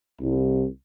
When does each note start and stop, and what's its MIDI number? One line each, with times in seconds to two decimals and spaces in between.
0.21 0.67 36